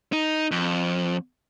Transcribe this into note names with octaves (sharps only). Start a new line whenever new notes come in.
D#4
F2